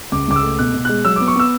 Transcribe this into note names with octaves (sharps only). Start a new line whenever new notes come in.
C#2 D6
C#2 D6
E6
A3
B2 F#6
B2
G#3 F#6
F#3 E6
B3 D6
C#6
B3 E6